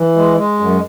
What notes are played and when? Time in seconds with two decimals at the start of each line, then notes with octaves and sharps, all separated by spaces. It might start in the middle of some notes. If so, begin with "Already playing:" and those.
Already playing: E3
0.16 G#3
0.37 G#3
0.59 F#2